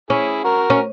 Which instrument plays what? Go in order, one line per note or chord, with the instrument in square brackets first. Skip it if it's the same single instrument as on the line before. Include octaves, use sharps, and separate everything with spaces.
[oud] C#4 [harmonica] E4 G#4
[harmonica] F#4 A#4
[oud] C#4